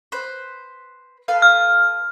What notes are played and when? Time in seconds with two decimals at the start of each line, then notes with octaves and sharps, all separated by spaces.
0.12 B4 C5
1.28 A4 B4 F5
1.42 F6